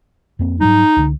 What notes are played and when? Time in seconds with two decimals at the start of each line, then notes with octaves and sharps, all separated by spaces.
0.39 F2 A#3 C4
0.60 G#2 F#3 G3 D#4
0.96 C#2 D3